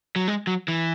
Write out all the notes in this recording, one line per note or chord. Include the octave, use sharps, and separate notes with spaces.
F#3
G#3
F#3
E3